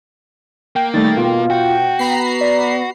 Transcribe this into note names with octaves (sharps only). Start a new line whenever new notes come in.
A#3 G5
D#3 G3 A3 A6
B2 F4
F#4 G5
B3 A#5 B5 C7
D5